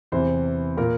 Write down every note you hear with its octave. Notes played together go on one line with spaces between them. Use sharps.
E2 C3 E3 C5
A#2 A#4